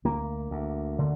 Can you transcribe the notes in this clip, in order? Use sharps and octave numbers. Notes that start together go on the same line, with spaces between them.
D2 A#3
D2
D3